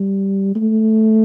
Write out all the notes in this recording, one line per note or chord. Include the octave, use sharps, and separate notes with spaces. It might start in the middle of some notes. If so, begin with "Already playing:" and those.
Already playing: G3
A3